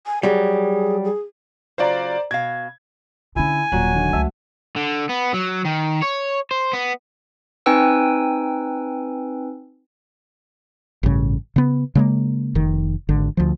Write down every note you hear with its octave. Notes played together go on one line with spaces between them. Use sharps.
G#5
F#3 G3 G#4
G#4
C#3 F#3 F4 C5 D5 A#5
B2 F5 G#6
D3 C#4 E4 G#5
D#1 A#2 F#3 A#5
D3 D#3
C#2 A3 E5 A5 E6
D3
B3
F#3
D#3
C#5
C5
B3
C4 D#4 B4 G5 G#5 E6
A1 G2 C#3
C#3 B3
C#3 G#3 A#3
F1 D#3
G#1 D3
D2 F3